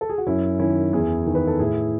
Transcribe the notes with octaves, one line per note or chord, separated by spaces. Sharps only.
A4
G#4
F#4
F#2 C#4 E4
D#3 C#4 E4
E2 E4 G#4
D#3
B4
A4
A2 E4 G#4